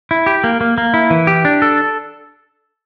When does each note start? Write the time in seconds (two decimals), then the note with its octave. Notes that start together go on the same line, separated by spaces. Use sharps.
0.11 E4
0.26 G4
0.44 A#3
0.61 A#3
0.78 A#3
0.94 E4
1.10 E3
1.27 G4
1.45 D4
1.62 A4